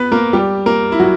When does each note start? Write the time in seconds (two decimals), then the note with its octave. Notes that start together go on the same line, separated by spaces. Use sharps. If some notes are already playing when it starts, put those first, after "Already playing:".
Already playing: B3 B4
0.12 A#3 A#4
0.33 G3 G4
0.66 A#3 A#4
0.92 E4
1.00 F#3 F#4